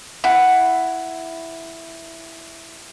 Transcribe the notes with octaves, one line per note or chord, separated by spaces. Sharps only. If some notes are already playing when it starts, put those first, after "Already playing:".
E4 F#5